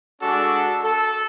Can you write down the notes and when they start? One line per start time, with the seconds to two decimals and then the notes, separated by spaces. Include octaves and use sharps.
0.21 G#3 D4 F#4 A4
0.83 A4